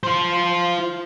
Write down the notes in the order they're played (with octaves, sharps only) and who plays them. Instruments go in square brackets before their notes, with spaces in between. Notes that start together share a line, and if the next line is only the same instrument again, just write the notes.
[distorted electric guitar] F4 C5